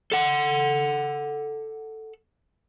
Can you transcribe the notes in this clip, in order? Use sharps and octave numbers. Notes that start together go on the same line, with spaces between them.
A4 F#5